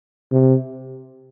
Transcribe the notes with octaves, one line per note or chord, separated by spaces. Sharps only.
C3